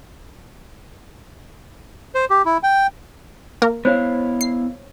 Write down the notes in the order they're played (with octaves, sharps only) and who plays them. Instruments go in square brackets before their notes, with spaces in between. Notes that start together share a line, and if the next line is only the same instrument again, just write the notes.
[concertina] C5
G4
E4
G5
[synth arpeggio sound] A#3 A#4
[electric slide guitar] B3 E4 F5 [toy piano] C5 C#5
[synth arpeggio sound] C7